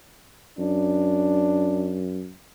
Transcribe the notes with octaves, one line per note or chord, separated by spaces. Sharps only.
F#2 D4